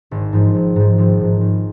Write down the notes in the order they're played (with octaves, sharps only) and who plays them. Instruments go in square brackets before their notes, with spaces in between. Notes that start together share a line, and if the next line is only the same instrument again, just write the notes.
[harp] G#1
G#2 F3
G#1
G#2 F3
G#1
G#2 F3
G#1